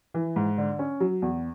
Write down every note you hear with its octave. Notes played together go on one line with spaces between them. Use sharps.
E3
G#2
D3
C#4
F#3
E2